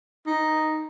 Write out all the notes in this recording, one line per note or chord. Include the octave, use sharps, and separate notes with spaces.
D#4